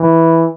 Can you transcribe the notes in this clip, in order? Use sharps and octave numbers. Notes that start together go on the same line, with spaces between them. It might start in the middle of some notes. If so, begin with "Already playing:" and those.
Already playing: E3